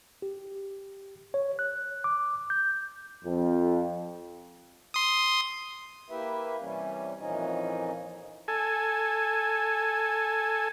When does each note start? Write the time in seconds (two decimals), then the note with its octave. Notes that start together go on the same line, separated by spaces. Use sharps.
0.22 G4
1.34 C#5
1.59 F#6
2.04 D6
2.50 G6
3.24 F2
4.94 C6 D#6
6.10 A#3 E4 G4 B4 E5
6.60 C3 E3 G3 C#4
7.18 F2 A#2 E3 F3 C#4 D#4
8.48 A4 G#5